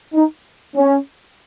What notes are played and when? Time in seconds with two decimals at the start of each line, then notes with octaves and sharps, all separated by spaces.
0.14 D#4
0.76 C#4